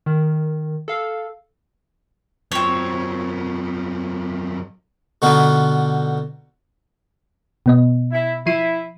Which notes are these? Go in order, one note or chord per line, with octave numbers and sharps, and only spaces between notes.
D#3
A4 F5
F#2 F3 C4 C#5
B2 D3 B3 D#4 F4 F#4
B2 B3 D#5
E4
F3 E4 C7 D#7